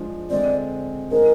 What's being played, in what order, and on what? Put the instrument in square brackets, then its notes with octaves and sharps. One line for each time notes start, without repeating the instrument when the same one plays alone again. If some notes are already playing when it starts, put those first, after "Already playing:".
Already playing: [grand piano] F3 G#3 D4 F4 C5
[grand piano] D3 G#3 C4 [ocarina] D5
[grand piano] G#3 D#4 G#4 C5 [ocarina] A#4